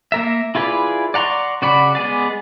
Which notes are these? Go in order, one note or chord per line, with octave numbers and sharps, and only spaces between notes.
A#3 A#4 E5
E4 F4 G#4 B4 D5
D5 F#5 A#5 C6 C#6
C#3 F#4 D5 F#5 B5
G#3 B3 G#4 D5